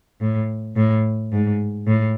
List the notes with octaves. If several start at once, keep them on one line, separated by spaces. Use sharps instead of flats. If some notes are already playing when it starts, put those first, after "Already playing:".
A2
A2
G#2
A2